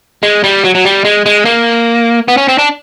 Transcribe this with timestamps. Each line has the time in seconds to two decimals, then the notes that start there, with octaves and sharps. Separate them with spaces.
0.23 G#3
0.44 G3
0.64 F#3
0.75 F#3
0.85 G3
1.05 G#3
1.26 G#3
1.45 A#3
2.28 B3
2.37 C#4
2.48 C4
2.58 D4